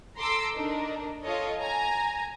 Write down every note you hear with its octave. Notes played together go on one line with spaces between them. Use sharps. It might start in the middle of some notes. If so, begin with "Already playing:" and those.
A4 A#5 C6 D6 E6
D4 D#4 A#4
F4 A4 C#5 D#5
G#5 A#5